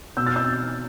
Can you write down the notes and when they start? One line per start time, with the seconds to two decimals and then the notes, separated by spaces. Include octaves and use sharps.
0.17 B2 E6 G6
0.27 F6 A6
0.36 E6 G6